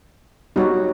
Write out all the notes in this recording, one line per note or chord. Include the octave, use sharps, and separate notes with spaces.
G3 D#4 F#4 C#5